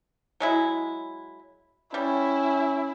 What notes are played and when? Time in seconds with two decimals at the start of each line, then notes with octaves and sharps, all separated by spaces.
0.40 F#3 G#3 E4
1.94 G3 C#4 E4